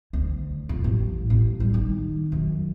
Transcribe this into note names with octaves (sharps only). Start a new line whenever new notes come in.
D2
F2
A1
A1
G3
D#3
F#2